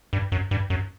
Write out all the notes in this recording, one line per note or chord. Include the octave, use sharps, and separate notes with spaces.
G2
F#2
G2
F#2